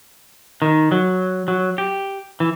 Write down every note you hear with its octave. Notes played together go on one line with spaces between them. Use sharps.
D#3
F#3
F#3
G4
E3